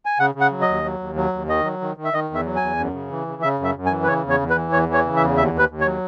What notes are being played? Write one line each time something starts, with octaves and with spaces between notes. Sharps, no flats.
G#5
C#3 F#5
C#3
F#5
F#3
D#5
D#2
F#3
D#2
F#3
D#2
D#3 D#5
F#3
D#3
D#3
E5
D#3 D#5
E2 E5
F#3
G#5
E2
F#2
C#3
E3
C#3
C#3 E5
F#2 E5
F#2
G#5
E3
B4
C#3 C#5
E2
C#5
E2
B4
E3
E2 C#5
E3 C#5
C#3
E5
E2
D#2 E5
D#2
B4
D#2
C#5
F#3